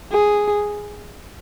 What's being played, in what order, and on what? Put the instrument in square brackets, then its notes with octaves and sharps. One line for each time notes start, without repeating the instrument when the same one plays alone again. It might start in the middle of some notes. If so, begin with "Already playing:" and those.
[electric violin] G#4